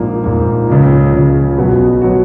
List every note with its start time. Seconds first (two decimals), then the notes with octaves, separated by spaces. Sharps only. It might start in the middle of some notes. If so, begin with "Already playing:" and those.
Already playing: A#1 G#2 F3 A#3
0.24 A#1 G#2 F3 A#3
0.67 C#2 C#3 F3
1.13 C#2 C#3 F3
1.58 B1 B2 F#3 B3 F#4
2.01 B2 F#3 B3 F#4